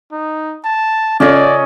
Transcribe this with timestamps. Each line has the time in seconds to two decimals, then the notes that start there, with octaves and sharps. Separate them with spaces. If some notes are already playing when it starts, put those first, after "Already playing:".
0.12 D#4
0.65 A5
1.20 C#3 C#4 F4 A4 D5 D#5